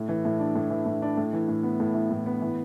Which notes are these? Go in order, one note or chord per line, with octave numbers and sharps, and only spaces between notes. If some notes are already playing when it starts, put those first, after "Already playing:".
Already playing: A2
E3
A2
D4
A2
E3
A2
D4
A2
E3
A2
B3
A2
E3
A2
B3
E3